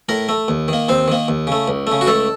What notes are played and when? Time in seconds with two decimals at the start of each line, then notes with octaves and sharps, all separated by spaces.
0.09 A2 A#4 A#5
0.29 A3
0.48 D#2
0.68 D#3 A#3
0.89 D#2 C4 C5
1.08 D#3 A#3
1.28 D#2
1.47 C#3 A3
1.68 C#2
1.87 C#3 A3
2.01 F#4
2.07 C#2 A3 A4